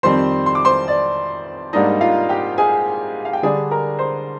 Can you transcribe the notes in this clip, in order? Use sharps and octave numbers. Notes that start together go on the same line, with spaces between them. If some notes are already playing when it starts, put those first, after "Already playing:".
F2 D#3 G3 C4 C5 C6
C6
D6
C5 C6
D5
G#2 G3 A#3 D4 D#4 D#5
F4 F5
G4 G5
G#4 G#5
F5
G5
D3 G3 D4 G#4 G#5
A#4 A#5
C5 C6